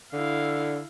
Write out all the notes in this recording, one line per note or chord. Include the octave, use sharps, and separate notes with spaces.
D3 E4 F5